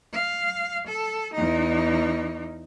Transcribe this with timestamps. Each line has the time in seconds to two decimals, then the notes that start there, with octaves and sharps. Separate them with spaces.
0.13 F5
0.87 A4
1.34 E2 D#4